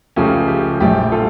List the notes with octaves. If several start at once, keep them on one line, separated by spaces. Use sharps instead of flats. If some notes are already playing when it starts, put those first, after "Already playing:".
C#2 C#3 F3 A3 C#4 G4
G4
A#1 A2 G3 G4
F4 A4